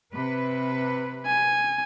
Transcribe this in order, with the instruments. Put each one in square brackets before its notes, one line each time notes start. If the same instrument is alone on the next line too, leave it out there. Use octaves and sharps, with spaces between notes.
[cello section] C3 B4
[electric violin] G#5